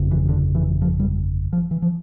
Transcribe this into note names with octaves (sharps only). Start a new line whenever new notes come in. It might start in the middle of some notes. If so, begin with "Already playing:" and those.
Already playing: G1 F2 C#3
E3
D3
E3
F3
G3
F3
E3
F3